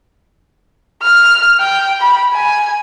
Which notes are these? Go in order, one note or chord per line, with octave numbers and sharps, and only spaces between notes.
F6
G5
B5
G#5